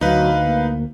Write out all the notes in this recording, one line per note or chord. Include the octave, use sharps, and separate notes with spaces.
D2 F#3 D#4 B4 F5
A#3